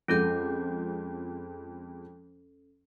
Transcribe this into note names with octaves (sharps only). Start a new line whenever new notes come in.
F2 F3 G#3 C#4 A4 G6